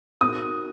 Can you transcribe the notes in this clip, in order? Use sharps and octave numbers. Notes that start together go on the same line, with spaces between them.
D#4 F#4 A#4 D#6